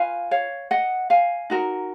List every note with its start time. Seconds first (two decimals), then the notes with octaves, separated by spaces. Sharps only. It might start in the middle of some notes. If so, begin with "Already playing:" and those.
Already playing: F4 B4 F5 G#5
0.31 C#5 F5
0.71 D#5 F#5
1.10 F5 G#5
1.50 D#4 F#4 A#4